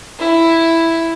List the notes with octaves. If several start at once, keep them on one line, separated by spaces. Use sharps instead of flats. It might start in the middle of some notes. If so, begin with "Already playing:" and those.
E4